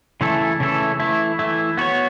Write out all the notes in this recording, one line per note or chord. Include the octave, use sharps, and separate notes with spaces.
C#3 E3 A3 E4 A4
C#3 E3 A3 E4 A4
E3 A3 E4
E3 A3 E4
B3 F#4 C#5